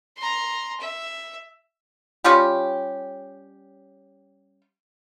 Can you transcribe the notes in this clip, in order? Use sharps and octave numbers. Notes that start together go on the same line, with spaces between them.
A#5 C6
E5
G3 C#4 F4 G4